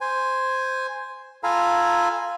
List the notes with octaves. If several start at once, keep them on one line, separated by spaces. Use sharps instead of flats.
C5 G#5
F4 A4 F5 G#5 A#5 B5